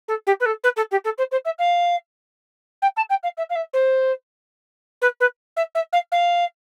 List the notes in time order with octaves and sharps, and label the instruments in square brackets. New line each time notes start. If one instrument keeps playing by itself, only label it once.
[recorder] A4
G4
B4
A4
B4
A4
G4
A4
C5
C5
E5
F5
G5
A5
G5
F5
E5
F5
E5
C5
B4
B4
E5
E5
F5
F5